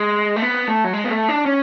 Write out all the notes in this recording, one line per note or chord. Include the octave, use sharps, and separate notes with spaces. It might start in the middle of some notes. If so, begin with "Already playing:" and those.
Already playing: G#3
A3
B3
A3
F#3
G#3
B3
A3
D4
C#4